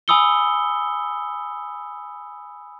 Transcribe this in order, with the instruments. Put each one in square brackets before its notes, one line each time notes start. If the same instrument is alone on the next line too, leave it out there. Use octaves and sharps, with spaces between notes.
[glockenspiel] G#5 B5 D#6 E6 C#7 G7